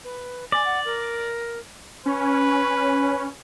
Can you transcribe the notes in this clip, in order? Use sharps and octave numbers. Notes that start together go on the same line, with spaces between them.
B4
D5 G#5
F#5
A#4
C#4 B4